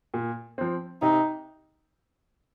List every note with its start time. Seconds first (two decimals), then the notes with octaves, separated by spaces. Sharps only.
0.14 A#2
0.58 F3 C4
1.02 C3 D#4